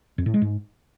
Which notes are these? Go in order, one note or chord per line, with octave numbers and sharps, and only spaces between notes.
F2
A2
G#3
G#2